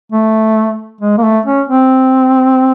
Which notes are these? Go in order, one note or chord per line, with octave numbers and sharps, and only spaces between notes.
A3
G#3
A#3
A3
C#4
C4